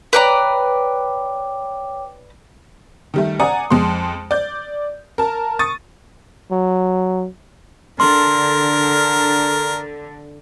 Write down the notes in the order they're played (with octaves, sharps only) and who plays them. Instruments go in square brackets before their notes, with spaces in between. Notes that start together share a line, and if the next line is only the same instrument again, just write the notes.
[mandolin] B4 D5 A#5 [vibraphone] C#5 G5 D6
[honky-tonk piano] D#3 G3 A3
D5 F#5 G#5 A#5 D#6
F2 G#3 C6
D5 G6
A#4 A5
C#6 D#6 A6 D#7
[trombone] F#3
[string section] D3 [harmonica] A#4 [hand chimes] C6